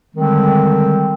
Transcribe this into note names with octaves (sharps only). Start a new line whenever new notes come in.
D3 D#3 G3 G#3 C4